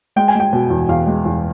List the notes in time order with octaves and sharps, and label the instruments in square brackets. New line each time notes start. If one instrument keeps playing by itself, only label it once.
[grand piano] G#3 G5
G#5
G#3 G5
B2
E2
E2 F5
G#3
E2